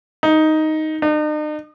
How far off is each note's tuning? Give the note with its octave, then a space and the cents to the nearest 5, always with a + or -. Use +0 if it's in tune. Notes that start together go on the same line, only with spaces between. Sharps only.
D#4 +5
D#4 -45